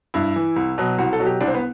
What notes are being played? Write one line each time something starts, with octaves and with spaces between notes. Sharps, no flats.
G2 E4
E3
C2
B2 F#3
C2 F#4
A4
B2 F#3
G4
C2 D4
C4
B3